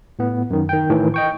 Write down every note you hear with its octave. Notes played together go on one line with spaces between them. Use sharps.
A2 B3
F#2 D#3
D#3 G5
A2 D#3 E3
D#5 G5 C#6